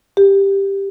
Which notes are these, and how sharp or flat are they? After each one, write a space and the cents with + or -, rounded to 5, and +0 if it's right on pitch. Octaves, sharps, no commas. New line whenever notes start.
G4 +5